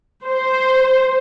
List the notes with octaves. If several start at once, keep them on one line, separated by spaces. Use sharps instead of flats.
C5